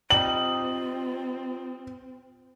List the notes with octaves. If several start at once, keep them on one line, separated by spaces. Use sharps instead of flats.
G3 C4 D#4 F4 F#7